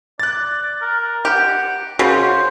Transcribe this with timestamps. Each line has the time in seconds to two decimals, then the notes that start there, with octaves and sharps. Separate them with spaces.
0.20 D5 F#6 A6
0.81 A#4
1.25 G4 F#5
1.99 C#3 F#4 C5